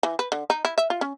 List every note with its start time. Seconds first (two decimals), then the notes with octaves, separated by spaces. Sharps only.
0.03 E3
0.19 B4
0.32 D3
0.50 D#4
0.65 E4
0.78 E5
0.90 F4
1.01 C#4